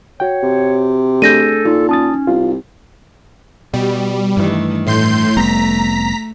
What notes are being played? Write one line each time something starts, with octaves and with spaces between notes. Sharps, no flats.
F#4 C#5 G5
C3
A3 D4 G#4 A4 G6 A#6 D#7
A#2 D#4
C#4 A5 D#6 A6
C2 F4
B2 G3
G2 D#3 E3 A3
A2 A3 C6 G6
F1 G3 B3 A#5 B6